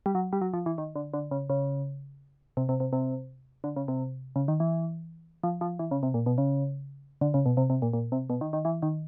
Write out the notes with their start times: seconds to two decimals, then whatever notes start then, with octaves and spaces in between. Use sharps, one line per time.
0.06 G3
0.15 F#3
0.33 G3
0.41 F#3
0.54 F3
0.66 E3
0.78 D#3
0.96 D3
1.14 D3
1.31 C#3
1.50 C#3
2.57 C3
2.69 C3
2.80 C3
2.93 C3
3.64 D3
3.76 C#3
3.88 C3
4.36 C#3
4.48 D#3
4.60 E3
5.43 F3
5.61 F3
5.79 E3
5.91 C#3
6.03 C3
6.14 A#2
6.26 B2
6.38 C#3
7.21 D3
7.34 C#3
7.46 B2
7.57 C3
7.70 C3
7.82 A#2
7.93 A#2
8.12 C3
8.30 B2
8.41 D#3
8.53 D#3
8.65 E3
8.82 D#3